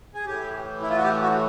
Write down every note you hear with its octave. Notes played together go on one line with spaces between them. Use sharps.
G#4
A2 E3 G4
E4
F4
F#4
G4
F#4